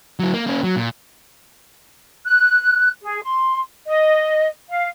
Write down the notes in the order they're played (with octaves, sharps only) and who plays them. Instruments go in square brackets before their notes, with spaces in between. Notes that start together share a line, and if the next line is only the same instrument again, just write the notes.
[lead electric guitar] F#3 E4
A#3
A#3 C#4
F#3
A#2
[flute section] F#6
G#4
C6
D#5
F5